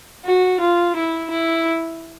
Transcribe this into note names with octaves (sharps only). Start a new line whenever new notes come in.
F#4
F4
E4
E4